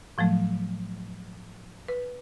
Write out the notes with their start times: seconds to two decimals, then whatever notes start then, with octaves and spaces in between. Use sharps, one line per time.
0.18 A2 F3 F#3 A3
1.88 B4